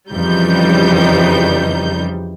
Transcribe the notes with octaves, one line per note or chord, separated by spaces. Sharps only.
F2 C#3 E3 G3 D#4 G6